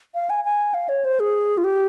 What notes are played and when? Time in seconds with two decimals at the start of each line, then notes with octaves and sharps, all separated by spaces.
0.15 F5
0.30 G#5
0.44 G#5
0.74 F5
0.89 C#5
1.05 C5
1.20 G#4
1.58 F4
1.64 G4